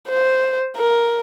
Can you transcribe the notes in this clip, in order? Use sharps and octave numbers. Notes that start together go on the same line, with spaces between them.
C5
A#4